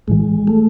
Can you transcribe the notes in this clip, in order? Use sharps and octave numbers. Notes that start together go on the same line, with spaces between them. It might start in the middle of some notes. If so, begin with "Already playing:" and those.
B1 A2 E3 G#3
A3